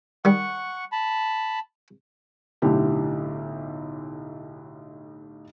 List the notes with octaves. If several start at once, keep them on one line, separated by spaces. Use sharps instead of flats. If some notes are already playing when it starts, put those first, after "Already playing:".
D#3 G3 F#5 C#6
A5 B5
B1 A2 D3 E4 G4